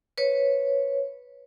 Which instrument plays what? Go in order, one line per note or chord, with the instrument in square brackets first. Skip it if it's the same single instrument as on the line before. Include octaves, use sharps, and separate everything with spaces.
[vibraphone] B4 C#5